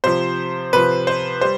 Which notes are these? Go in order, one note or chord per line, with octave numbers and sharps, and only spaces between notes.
C3 F3 C5
C3 F3 B4
C5
G3 C5